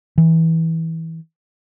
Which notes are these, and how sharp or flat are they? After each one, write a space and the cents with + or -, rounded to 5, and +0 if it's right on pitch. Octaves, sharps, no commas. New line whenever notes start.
E3 -20